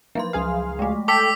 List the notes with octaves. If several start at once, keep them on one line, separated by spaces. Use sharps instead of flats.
F3 F#3 A#3 C6
C#2 G#4 F5
G#3 A3
A4 G5 D6 E6 B6